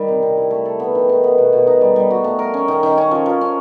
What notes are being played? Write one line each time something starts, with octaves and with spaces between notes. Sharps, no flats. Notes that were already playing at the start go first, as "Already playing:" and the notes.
Already playing: D#3 G3
C3
C3
E4
A3
A4
B3
D#3
D#3
B3
B2
B2
D#4
G3
G3
F#4
A3
A#4
C#4
D#3
D#3
C#4
F3
F3
C#4